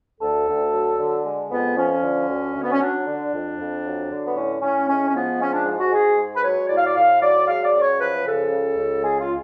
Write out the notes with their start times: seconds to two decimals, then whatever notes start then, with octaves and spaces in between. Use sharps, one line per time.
0.20 D2 A4
0.47 D2
0.72 F#3
0.98 D3
1.24 G#3
1.50 F2 B3
1.76 F3 C#4
2.03 D3
2.28 D2
2.55 D2
2.62 B3
2.71 C#4
2.79 F#3 D4
3.06 D3
3.32 F2
3.58 F2
3.84 F#3
4.10 D3
4.26 B3
4.35 A2 C#4
4.61 A2 C#4
4.88 G#3 C#4
5.06 C#4
5.13 F3 B3
5.39 G#3 C#4
5.53 D4
5.65 G#2
5.78 F#4
5.91 G#2 G#4
6.18 G#3
6.34 B4
6.42 F#3 C#5
6.69 A2 D5
6.77 F5
6.85 D5
6.95 A2 F5
7.20 F#3 D5
7.47 G#3 F5
7.64 D5
7.73 F#2
7.81 C#5
7.99 F3 B4
8.24 C#3 A4
8.50 C#2
8.76 C#2
9.02 G#3 G#4
9.19 F4